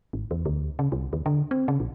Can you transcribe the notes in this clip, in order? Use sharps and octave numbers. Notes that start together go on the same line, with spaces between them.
G#1
E2
D2
C#3
C2
D#2
D3
C4
C#3
A#1